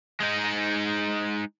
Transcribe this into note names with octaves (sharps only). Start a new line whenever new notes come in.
G#3 D#4